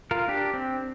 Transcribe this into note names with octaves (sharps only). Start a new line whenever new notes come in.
F4 A#4
D4 G4
C4